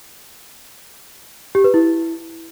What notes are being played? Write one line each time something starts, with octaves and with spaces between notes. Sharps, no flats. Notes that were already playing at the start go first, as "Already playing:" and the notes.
G4
B4
E4